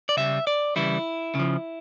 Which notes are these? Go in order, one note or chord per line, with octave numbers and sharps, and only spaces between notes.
D5
C#3 G3 E5
D5
C#3 E3 G3 E4
C#3 F3